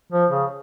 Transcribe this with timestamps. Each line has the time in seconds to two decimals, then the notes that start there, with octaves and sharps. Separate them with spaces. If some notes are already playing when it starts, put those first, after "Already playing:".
0.12 F3
0.31 C#3